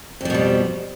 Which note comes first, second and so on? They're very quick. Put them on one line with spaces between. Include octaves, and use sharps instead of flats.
F2 F3 B2 G3